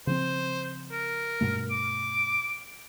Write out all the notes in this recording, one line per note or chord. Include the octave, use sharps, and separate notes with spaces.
C#3 F3 C4 C5
A#4
G2 B2 A3
D6